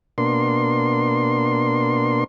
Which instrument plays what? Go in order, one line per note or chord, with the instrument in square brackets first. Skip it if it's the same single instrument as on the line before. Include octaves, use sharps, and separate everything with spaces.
[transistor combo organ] B2 A#3 D4 C6